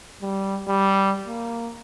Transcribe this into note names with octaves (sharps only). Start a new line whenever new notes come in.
G3
G3
A#3